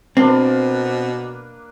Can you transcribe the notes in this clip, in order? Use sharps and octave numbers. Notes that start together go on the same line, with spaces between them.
B2 A#3 C4 D4 B4